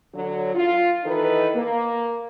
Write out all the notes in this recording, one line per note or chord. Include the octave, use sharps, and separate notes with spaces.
D3 F#3
F4
D#3 E3 D#4 A4 B4
A#3